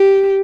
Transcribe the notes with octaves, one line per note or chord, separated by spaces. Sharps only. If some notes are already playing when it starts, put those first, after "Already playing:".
Already playing: G4